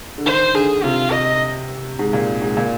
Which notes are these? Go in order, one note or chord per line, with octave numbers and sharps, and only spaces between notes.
D3
D#3 C5
D3 G#4
C3 F4
D#5
G#2
A#2
G#2
A#2